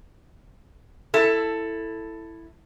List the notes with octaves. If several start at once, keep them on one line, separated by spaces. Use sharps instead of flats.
E4 A4